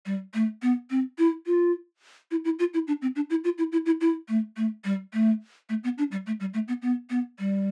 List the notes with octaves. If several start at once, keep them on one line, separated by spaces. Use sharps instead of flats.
G3
A3
B3
C4
E4
F4
E4
E4
F4
E4
D4
C4
D4
E4
F4
E4
E4
E4
E4
A3
A3
G3
A3
A3
B3
D4
G3
A3
G3
A3
B3
B3
B3
G3